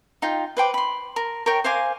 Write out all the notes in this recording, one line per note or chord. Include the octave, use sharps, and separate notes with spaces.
D#4 F4 G5
B4 C5 G5 D6
B5 C6
A#4
A#4 C#5 G5
C5 F5 G#5 D6